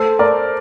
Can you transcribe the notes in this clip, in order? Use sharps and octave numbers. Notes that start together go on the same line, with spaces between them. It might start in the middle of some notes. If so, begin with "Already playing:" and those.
Already playing: A3 A4 C5
A3 A#4 D5